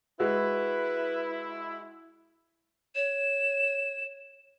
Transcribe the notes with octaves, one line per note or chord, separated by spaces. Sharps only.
G#3 E4 F#4 B4
C#5 E7